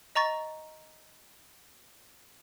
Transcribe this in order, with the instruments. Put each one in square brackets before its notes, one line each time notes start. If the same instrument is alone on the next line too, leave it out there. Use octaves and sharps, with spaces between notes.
[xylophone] D#5 A#5 C#6 A6